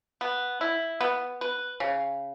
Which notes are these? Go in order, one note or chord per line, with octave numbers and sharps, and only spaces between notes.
B3
E4
B3
B4
C#3